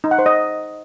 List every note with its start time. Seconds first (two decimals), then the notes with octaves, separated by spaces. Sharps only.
0.04 D#4
0.11 F#5
0.19 C5
0.26 D#5